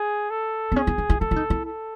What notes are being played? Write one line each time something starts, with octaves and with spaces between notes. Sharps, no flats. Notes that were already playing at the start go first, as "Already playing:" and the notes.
Already playing: G#4
A4
B3
C#4 G#4
E4
D#4
E4
E4 A4
E4
D#4
E4
A4